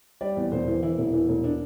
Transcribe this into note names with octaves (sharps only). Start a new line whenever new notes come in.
G3 D5
E2
E1 C5
E3
E3 E4
E1
E3
E1
D4